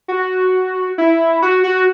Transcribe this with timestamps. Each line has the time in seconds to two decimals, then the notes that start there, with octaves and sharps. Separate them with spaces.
0.08 F#4
0.98 E4
1.42 F#4
1.64 F#4